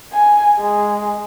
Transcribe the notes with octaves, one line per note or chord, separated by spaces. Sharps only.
G#5
G#3